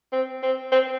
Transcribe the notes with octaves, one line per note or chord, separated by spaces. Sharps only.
C4
C4
C4